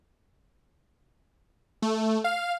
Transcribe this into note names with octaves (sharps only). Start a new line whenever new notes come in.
A3
F5